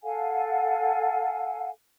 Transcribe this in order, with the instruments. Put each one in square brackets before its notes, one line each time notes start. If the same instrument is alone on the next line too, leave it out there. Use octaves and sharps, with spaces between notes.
[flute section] A4 F5 F#5 G#5